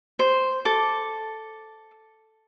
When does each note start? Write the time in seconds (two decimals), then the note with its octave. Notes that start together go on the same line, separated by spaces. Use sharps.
0.19 C5
0.65 A4 D6